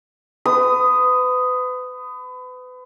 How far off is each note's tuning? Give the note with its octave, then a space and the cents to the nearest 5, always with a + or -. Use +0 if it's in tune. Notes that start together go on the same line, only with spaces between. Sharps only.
B4 +35 D#6 +0